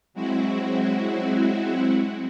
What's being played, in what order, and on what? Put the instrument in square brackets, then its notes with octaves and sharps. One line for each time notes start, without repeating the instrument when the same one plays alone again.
[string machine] F#3 G#3 C4 E4 F#4